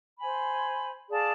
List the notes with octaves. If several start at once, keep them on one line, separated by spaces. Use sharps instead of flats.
C5 G#5 B5
G#4 D5 F5 A5